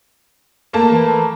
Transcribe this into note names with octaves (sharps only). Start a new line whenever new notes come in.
A3 A#3 A5
E3